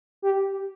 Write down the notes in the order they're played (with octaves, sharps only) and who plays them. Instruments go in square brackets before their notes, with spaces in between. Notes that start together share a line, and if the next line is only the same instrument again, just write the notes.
[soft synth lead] G4